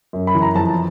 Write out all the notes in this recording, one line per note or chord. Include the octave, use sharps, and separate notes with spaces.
F#2
B5
E3
A#5
F2 A5